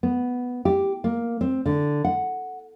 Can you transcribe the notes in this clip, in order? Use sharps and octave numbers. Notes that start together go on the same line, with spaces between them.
B3
G4
A#3
C4
D3
F#5